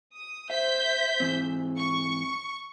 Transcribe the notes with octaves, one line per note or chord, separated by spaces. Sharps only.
D#6
C5 E5 G6 B6
G#2 E3 C4
C#6